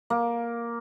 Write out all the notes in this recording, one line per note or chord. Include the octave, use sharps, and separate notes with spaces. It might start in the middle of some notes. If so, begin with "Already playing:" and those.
A#3